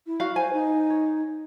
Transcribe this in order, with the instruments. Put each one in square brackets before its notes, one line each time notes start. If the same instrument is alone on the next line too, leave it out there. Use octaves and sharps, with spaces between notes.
[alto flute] E4
[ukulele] F#4 F5
[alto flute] C5 [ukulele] G#5
[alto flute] D#4
[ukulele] C#5